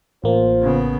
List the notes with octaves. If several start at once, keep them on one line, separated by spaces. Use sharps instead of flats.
A1 A#3 F4 C5
C#3 B3